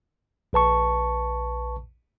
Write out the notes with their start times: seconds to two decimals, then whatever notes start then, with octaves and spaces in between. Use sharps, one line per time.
0.53 A#1 B4 A5 C#6